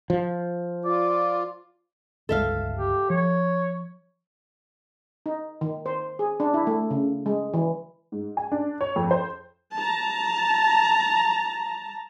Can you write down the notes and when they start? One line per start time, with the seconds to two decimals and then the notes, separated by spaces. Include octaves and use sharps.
0.10 F3
0.85 F4 D5
2.29 G1 C#2 G#3 A4 E5 F5
2.76 G4
3.10 F3 C#5
5.26 D#4
5.61 D#3
5.86 C5
6.19 G#4
6.40 D4
6.54 E4
6.67 A3
6.90 C#3
7.26 G#3
7.54 E3
8.12 G#2
8.37 G#5
8.52 D4
8.81 C#5
8.96 F2
9.11 C5
9.76 A5 A#5